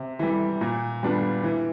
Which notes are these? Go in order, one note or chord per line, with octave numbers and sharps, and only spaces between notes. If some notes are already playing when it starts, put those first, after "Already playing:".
Already playing: C3
E3 G3
A#2
G3 B3 D4 F4
E3